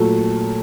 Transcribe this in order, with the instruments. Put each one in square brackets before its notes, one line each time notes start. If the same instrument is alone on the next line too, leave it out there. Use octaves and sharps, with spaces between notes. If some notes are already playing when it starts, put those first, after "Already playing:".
Already playing: [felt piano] A#2 F#3 A3 A4